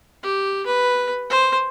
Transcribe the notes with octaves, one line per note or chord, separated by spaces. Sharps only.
G4
B4
C5